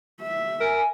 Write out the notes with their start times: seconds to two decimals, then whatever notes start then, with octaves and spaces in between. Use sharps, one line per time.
0.21 E5
0.61 A#4 G#5